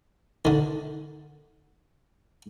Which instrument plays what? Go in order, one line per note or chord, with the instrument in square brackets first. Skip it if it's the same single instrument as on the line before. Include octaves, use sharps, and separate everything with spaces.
[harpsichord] D3 D#3